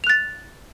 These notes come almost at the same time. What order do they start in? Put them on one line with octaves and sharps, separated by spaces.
F7 F#6 A6